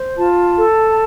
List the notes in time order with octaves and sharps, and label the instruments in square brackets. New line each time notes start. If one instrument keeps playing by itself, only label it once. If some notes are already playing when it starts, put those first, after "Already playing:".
Already playing: [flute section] C5
F4 A5
A4